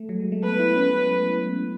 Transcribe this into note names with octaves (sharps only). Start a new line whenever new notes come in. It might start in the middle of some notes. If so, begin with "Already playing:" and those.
Already playing: A3
F#3
G#3
A3
B3 B4
E4
C#4